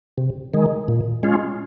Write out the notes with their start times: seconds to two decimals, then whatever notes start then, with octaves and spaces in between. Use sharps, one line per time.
0.18 C3
0.54 D#3 G#3
0.88 A#2
1.23 G#3 C#4 F4